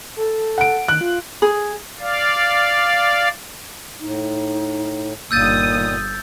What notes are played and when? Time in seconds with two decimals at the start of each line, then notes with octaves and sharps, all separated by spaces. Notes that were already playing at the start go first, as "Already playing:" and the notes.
0.16 A4
0.58 F#5 D7
0.88 D#3 F#6
1.01 F4
1.42 G#4
2.00 D5 F5
4.00 A2 D#4
5.31 G1 A#2 D#3 A#3 D#6 E6 G6 A6